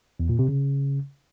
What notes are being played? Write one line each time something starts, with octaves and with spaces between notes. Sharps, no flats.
E2
A#2
C3
C#3